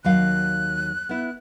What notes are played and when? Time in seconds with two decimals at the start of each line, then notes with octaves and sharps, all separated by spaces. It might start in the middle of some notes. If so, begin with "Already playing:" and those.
0.04 D#2 F#3 F5 F#6
1.09 B3 E4